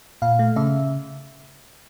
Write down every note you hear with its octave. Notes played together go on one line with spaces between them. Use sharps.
A#2 F5
A3
C#3 E5